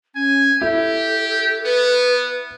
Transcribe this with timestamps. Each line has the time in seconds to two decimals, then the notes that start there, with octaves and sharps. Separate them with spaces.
0.16 C#4 G#5
0.62 E4 G4 A4
1.65 B3 B4